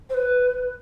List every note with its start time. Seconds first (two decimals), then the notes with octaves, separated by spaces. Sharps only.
0.10 C5
0.14 B4